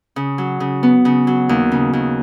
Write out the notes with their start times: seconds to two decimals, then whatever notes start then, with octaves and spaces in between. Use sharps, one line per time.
0.16 C#3
0.38 F#3
0.60 C#3
0.83 B3
1.05 C#3
1.27 F#3
1.49 D#2
1.72 C#3
1.93 D#2